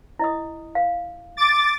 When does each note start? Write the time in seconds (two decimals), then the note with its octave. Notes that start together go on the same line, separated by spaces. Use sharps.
0.19 E4 D#5 D#6
0.75 F5
1.37 D6 A6